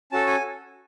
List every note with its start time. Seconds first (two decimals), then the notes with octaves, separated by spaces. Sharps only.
0.12 C#4 F#4 A4 A5
0.27 G#5